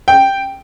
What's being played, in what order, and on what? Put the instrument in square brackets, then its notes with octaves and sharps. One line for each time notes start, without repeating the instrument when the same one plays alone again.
[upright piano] G5